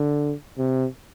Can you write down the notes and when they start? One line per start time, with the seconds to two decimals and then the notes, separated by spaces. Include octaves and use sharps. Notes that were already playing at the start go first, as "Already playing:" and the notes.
Already playing: D3
0.58 C3